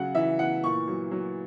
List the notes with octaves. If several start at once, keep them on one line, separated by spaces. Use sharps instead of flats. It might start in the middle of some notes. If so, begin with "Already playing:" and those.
Already playing: C#3 F#3 F#5
E3 E5
E3 F#5
A#2 C#6
F#3
F#3